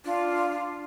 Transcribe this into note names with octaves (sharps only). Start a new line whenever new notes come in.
D4 F4